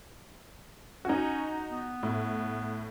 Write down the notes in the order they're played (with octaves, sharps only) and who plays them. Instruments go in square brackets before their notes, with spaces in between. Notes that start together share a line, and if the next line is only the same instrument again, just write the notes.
[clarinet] C#4 [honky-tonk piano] D#4 F#4
[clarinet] B3
[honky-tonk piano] A2